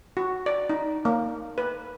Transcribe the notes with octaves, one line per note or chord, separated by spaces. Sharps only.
F#4
D5
D#4
A#3
B4